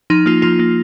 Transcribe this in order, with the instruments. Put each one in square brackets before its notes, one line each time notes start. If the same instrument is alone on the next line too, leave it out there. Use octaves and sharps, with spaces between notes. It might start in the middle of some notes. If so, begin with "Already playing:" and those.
[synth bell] F3 D#4
A#3 F4
F3 F4
A#3